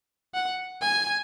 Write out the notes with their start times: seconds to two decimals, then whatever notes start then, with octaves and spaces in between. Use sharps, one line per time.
0.35 F#5
0.82 G#5